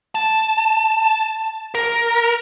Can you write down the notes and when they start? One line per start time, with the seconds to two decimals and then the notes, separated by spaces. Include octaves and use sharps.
0.15 A5
1.75 A#4